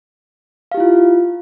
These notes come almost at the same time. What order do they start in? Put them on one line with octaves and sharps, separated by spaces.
F5 G4 E4 F4